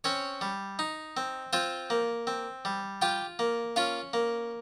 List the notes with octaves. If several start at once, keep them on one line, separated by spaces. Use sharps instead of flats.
C4 C#4 C#5
G3
D#4
C4
C4 F4 C5
A#3
C4
G3
F4 G4 G5
A#3
C#4 F4 F5
A#3